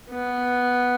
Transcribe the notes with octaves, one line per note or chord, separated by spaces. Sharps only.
B3